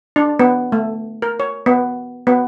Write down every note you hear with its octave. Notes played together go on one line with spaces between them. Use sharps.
D4
B3
A3
A#4
C#5
B3
B3